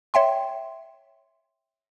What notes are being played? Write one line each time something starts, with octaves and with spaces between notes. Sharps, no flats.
C#5 E5 G5 C6